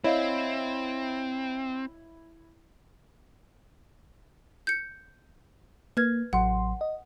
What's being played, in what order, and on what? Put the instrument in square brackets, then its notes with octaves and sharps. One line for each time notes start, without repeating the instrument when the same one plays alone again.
[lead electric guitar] C4 [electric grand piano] E4 [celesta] C#5 D#5 F5
[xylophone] G6 C#7
[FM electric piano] A#3 [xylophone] B4 F6 G#6
[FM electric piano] A1 F#3 C6 [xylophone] F#5
[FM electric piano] D#5